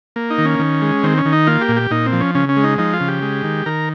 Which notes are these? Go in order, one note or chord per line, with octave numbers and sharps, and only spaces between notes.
A#3
D#4
D#3
C#4
D#3
G#3
D#3 C4
C#4
D#3
D#4
A#3 F4
G4
A#2
G4
A#2 D#4
C4
F3
C#4
C#3 C#4
C#4
G#3
D#4
F3 D#4
F4
C#3
G4
G#3
D#3
D#3 A#4